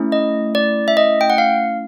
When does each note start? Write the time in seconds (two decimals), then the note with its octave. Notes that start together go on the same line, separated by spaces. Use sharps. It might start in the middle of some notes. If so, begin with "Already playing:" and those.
Already playing: A3 C#4 E4
0.12 D#5
0.55 D5
0.88 E5
0.97 D#5
1.21 G5
1.30 F#5
1.38 F5